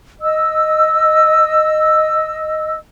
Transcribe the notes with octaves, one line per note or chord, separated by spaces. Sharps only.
D#5 E6